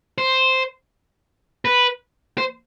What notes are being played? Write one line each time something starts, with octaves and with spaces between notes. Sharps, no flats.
C5
B4
C5